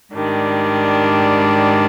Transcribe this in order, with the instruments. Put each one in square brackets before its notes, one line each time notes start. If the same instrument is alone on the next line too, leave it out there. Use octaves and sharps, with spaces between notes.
[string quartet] G#2 D#3 G3 D4